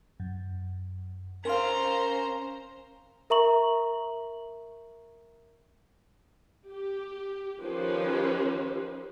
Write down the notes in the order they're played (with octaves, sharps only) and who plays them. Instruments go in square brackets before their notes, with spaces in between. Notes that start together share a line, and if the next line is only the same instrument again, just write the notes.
[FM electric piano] F#2
[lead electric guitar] C#4 C6 [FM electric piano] A#4 F5 [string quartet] C5 A#5
[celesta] A#4 E5 A#5 C#6 F#7
[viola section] G4
D#3 F3 C#4 G4 B4 C5